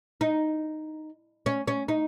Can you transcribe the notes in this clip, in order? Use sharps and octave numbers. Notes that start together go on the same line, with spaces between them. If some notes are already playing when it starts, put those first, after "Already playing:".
D#4
C#4
C#4
D#4